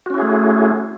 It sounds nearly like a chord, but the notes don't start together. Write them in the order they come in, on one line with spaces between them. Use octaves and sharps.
F#4 C#4 E4 G#4 A3